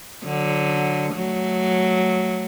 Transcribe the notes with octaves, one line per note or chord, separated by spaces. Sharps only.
D3 F#3
F#3 A3